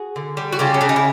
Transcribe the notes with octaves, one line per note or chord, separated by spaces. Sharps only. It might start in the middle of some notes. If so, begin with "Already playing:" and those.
Already playing: F#4 G#4
D3
G3
F#4
C#3 F4 G4
C#4
C#3 D4
D#4
E4